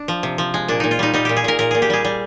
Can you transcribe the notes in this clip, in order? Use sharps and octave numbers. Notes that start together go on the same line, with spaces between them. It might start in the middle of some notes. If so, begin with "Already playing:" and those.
Already playing: D4
F3
C3
F3
G#3
A#2 D4
A#2 D#4
F4
G3 D#4
G3 D#4
A#2 G4
G#4
A#2 A#4
A#2 A#4
A#2 G#4
G4
G3 G#4
G3